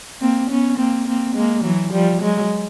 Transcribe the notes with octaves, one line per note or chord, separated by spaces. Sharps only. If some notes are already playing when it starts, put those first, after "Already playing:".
A#3 C4
B3 C#4
A#3 C4
A#3 C4
G#3 A#3
E3 F#3
F3 G3
F#3 G#3